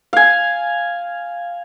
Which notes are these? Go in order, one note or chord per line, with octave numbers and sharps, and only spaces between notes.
F5 G#5